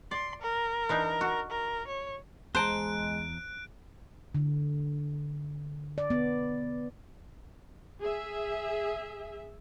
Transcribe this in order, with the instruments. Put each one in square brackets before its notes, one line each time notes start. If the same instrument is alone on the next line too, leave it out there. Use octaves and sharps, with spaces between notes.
[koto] D5 [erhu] C6
[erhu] A#4
[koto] E3 D4 D#4
F#4
[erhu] A#4
C#5
[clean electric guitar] E2 A5 A#5 [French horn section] G#3 [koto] C5 [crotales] F#6 D7
[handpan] D3
D5
B3
[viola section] G#4 E5